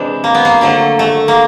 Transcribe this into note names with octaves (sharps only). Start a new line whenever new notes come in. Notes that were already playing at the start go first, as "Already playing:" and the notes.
Already playing: C3 E3 G#3 D4
A#3
B3
A#3
D3 F#3 A3
A3
A#3